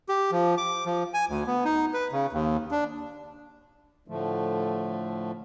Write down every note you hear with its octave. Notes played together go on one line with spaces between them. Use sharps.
G4
F3
D6
F3
G#5
D2
B3
D#4
B4
C#3
D#2
D4
A2 D3 F3 A3